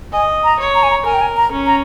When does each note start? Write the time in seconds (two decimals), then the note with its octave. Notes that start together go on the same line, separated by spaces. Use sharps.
0.13 D#5 G#5
0.44 A#5
0.60 C#5
0.75 A#5
0.83 G#5
0.90 A#5
1.05 A#4 G#5
1.13 G5
1.21 G#5
1.37 A#5
1.52 C#4
1.66 A#5